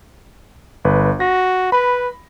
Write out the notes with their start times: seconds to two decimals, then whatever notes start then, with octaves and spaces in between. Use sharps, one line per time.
0.85 G1 B4
1.20 F#4 A#6
1.72 B4 B5